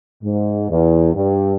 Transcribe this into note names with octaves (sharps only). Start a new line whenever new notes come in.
G#2
E2
G2